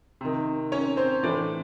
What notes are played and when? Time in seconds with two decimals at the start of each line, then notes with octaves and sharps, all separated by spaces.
0.21 C3 D#3
0.72 C#4 C#5
0.97 C4 C5
1.23 A2 E3 D4 D5